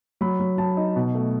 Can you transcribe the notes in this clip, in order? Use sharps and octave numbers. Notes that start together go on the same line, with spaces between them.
F#3 B5
F#3
F#3 A5
D#4
B2
A3